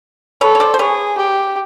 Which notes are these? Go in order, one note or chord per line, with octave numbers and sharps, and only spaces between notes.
A4 B4 C#5
C#5
C5 D5
C5
G#4 B4 C#5
G4